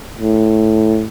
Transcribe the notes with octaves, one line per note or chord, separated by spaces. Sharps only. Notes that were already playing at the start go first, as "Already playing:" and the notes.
A2